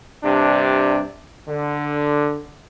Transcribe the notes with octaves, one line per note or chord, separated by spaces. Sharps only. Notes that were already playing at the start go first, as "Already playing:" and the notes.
G2 C3 D4
D3